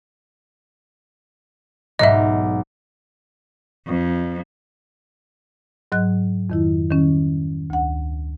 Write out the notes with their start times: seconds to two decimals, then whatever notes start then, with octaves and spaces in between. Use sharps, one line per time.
1.99 B1 G#2 D#5 E5
3.87 F2
5.92 G#2 F#3 D#5 F#6
6.50 F2 D#3 E4
6.91 D#3 G3 C#4
7.70 D2 F#5